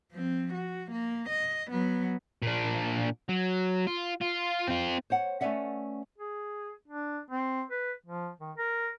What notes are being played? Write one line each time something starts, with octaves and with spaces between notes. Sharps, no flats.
F3 C4
F#4
A#3
D#5
F#3 B3
A#2 D4
F#3
F4
F4
C4 F4
C5 C#5 F#5
A3 C#4 B4 D5 E5 F#5
G#4
D4
C4
B4
F3
D#3
A#4